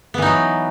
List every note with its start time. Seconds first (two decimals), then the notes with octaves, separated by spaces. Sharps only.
0.14 B3
0.18 E3
0.22 D#4
0.26 F#3